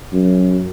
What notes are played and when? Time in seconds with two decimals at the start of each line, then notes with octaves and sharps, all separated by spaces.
0.13 F#2